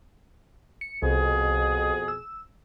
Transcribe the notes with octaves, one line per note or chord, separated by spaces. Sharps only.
C#7
C2 F2 B2 G#4
E6